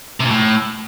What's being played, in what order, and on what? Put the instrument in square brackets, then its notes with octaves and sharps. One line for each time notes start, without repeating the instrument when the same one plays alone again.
[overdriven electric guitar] C3
A#2
A2